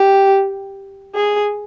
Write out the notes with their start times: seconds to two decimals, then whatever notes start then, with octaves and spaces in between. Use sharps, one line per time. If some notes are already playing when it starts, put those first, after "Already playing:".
Already playing: G4
1.15 G#4